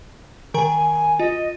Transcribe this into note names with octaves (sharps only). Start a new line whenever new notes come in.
D#3 A#4 G#5 A#5
F4 D#5